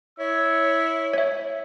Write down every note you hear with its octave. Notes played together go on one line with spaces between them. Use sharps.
E4 C#5 E6
C#5 E5